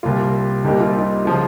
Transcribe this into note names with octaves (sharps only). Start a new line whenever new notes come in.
C2 C3 G3 A#3 F4
C2 C3 G3 A#3 D#4 G4
F4
D#4
C#3 F3 G#3 F4